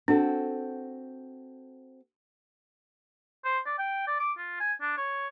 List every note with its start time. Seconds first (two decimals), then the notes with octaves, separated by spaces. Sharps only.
0.08 C4 D4 F#4 A4
3.45 C5
3.66 D5
3.78 G5
4.08 D5
4.20 D6
4.37 F4
4.60 G#5
4.81 D4
4.98 C#5